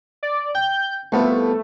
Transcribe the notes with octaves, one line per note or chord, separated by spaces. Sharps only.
D5
G5 G6
C2 A3 B3 F4